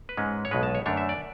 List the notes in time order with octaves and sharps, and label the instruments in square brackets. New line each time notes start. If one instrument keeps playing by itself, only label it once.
[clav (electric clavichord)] B4
G#2 G#3 C#4
C#5
B1 B2 G#3 B4
A5
C#5
F#2 D3 A3 D4 C#5
E5
D5